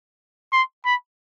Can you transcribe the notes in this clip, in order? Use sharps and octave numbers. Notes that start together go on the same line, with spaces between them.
C6
B5